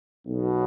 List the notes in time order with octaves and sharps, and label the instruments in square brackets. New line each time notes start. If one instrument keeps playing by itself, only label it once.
[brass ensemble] B1 B2